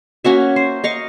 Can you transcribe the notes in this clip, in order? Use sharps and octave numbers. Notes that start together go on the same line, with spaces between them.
A#3 C#4 F#4 E5
C5
D#5 F5 C#6